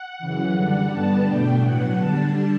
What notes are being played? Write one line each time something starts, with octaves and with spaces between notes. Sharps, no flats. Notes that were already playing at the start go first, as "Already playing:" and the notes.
Already playing: F#5
F#2 C#3 E3
D3 G3 D4 F#5
G2 D3 G3 B3 D4 A5
E2 B2 A3 D4 G5
A2 F#3 B3 F#5
D3 G3 D4 A5